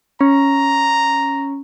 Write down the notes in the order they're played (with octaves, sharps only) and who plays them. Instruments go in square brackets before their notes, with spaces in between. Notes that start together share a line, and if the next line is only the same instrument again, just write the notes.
[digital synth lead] C#4 [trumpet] A#5